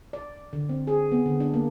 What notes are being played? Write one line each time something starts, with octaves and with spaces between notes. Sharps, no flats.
D5
D3
C4
G#4
B3
D3
D4
A#3